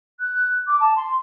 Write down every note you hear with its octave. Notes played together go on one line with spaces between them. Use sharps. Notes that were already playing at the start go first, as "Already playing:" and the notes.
F#6
D6
A5
C6